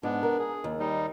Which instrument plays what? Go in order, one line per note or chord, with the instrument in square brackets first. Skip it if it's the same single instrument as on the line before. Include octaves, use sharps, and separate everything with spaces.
[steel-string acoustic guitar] G#2 [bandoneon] B3 D4
[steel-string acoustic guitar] A#4
[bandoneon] G#4
[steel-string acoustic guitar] D#2
[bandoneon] G3 D#4